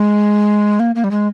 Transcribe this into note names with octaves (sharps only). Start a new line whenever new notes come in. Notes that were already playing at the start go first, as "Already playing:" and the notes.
Already playing: G#3
A#3
A#3
G3
G#3